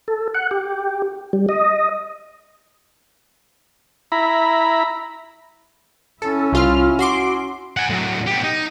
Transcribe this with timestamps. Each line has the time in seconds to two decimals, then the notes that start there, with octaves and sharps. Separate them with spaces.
0.08 A4
0.35 F#5
0.51 G4
1.33 G3
1.49 D#5
4.12 E4 A#5 B5
6.22 C#4 E4 A4
6.53 C2 F4 F6
6.99 F#4 C6 D6
7.77 F#5 G#5
7.90 A2 F#3
8.27 B3 G4
8.43 D#4